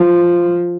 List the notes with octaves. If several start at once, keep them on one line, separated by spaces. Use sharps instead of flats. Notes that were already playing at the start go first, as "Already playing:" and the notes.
Already playing: F3